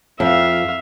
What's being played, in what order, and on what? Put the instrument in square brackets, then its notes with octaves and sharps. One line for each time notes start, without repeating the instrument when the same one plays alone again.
[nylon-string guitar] F2 [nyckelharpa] E5 F5